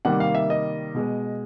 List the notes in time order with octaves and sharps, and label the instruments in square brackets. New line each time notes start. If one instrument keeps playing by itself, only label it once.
[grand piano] C3 D#3 G3 A#3 F#5
F5
E5
D#5
B2 G#3